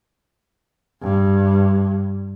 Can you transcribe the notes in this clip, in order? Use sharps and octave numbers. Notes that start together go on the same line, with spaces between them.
G2